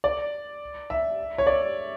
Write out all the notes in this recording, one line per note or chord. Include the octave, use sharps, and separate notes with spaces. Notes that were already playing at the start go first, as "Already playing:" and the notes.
D5
E5
C#5
D5